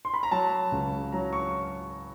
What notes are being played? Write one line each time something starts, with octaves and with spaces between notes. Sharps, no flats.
C6
B5
A#5
F#3 A5
C#2
F#3 A#5
C#6